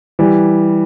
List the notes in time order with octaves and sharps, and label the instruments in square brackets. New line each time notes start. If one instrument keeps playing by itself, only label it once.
[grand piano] E3 G3